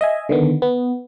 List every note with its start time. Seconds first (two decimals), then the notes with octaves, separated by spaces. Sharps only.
0.01 D#5 E5 G#5
0.29 D3 D#3 B3
0.62 B3